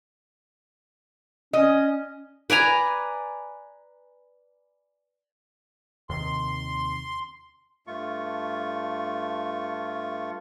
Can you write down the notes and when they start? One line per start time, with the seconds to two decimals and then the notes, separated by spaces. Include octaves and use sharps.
1.53 C#4 D#5
2.50 B4 D5 G#5 A#5
6.10 D#2 C3 D#3 C6
7.87 G2 A3 F4 C#6